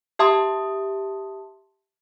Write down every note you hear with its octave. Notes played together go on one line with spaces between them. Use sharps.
G4 E5 A5 C6 D#6